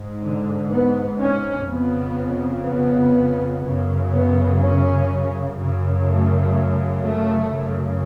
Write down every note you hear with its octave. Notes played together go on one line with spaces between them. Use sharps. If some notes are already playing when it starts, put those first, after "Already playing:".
Already playing: G#2
D3
B3
C#4
F2 C#3 B3
B3
F#2 C#3
B3
C#4
F#2 C#3
A3
A3
F#2 C#3